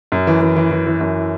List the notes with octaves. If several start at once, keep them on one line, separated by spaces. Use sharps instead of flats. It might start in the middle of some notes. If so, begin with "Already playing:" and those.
F#2
E3
E3
E3
E3
E3
F#2